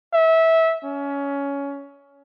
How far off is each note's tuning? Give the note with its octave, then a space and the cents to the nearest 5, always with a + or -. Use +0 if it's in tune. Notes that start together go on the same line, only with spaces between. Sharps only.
E5 -20
C#4 +20